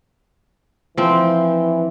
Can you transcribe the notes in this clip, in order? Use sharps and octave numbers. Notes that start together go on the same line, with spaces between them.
E3 F3 C4